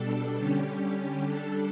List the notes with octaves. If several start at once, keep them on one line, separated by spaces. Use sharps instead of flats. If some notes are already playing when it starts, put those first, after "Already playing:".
Already playing: B2 G3 D4 A4
D3 G3 C#4 G4
G3 D4 A4